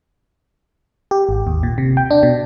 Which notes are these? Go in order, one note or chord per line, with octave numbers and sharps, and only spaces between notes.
G4
G#1
D#2
A#2
C3
G5
D4
B2